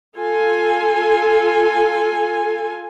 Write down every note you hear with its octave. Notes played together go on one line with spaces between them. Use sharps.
F4 A4 G#5